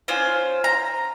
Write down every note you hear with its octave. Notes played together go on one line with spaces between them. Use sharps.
C#4 F4 C5
A#5